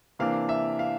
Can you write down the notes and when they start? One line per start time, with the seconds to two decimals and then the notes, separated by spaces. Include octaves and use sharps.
0.19 C3 E3 A#3 D4 F5
0.49 E5
0.79 F5